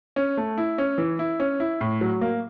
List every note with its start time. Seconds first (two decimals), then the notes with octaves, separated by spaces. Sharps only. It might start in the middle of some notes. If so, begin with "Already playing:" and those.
0.16 C#4
0.37 A3
0.58 E4
0.78 C#4
0.98 E3
1.19 E4
1.40 C#4
1.60 E4
1.81 A2
2.01 F#3
2.21 A#3